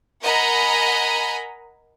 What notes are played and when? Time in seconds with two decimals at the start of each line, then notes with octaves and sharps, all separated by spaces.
0.22 A#4 D#5 F#5 G#5 A#5 B5